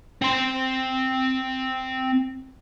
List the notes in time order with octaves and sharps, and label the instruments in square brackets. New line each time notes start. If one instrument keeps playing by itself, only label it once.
[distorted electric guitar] C4 C6